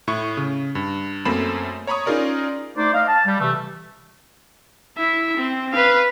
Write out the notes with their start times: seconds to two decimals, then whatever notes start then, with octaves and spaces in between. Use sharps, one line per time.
0.08 A2 E4 C#6
0.37 C#3
0.75 G2
1.25 F#2 A3 A#3 C4 B5 E7
1.87 C#5 A#5 B5 C#6 D#6
2.06 C#4 D#4 F4 G#4 A#4 D5
2.77 A3 D#4 C5 D5
2.93 D#5 F5
3.07 A5
3.26 G3
3.39 C3 E3 A3
4.98 E4 E5
5.37 C4
5.73 B4 F5